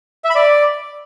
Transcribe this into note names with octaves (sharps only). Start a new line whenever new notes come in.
E5
B5
D5